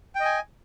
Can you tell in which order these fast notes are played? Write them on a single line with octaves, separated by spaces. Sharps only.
G5 D#5 G#5